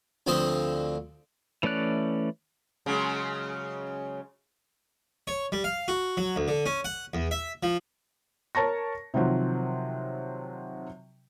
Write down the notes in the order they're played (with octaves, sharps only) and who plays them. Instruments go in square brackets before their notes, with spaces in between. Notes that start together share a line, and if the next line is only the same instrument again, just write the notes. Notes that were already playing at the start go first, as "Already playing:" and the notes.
[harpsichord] D2 D3 F3 C4 C5 D#5
[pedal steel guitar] E3 A3 C#4 D5 F#6
[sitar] C#3 F#3 G#3
[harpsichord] C#5
G3
F5
F#4
F#3
D2
D3
C#4
F#5
E2
E5
F3
[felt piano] A#4 C#5 A5 C#6 A#6
C3 D#3 F3 F#3 C4